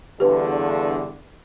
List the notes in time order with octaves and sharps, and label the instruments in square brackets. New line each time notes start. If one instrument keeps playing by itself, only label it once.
[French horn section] E2 G2 D3 [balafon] G4 B4